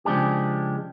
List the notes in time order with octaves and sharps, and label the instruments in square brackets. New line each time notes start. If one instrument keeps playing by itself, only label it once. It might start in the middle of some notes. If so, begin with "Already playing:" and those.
[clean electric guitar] C#3 F3 G#3 D4 G4